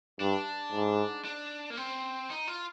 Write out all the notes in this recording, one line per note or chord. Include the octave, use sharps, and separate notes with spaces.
G2 D4
G#2
D4
A#3
C4
D#4
F4